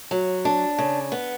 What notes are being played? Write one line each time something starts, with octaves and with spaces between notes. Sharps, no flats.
F#3
D4
C#3
B3